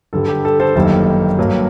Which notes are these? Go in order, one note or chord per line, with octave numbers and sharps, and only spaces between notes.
G2 D3 G3 A4
G4
A4
A4 C5
G1 F#2 D#3 G3 A#3 A4
G2 F#3 A#3